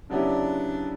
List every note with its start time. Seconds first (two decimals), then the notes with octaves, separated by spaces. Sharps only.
0.10 C#3 F#3 B3 D4 E4 G4